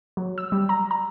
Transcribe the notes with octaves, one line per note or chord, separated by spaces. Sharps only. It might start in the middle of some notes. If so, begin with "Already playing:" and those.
F#3
E6
G3
A#5
A#5